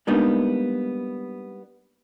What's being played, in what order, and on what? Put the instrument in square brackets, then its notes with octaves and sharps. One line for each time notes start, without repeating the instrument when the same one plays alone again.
[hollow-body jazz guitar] G3 G#3 A#3 B3 D4 D#4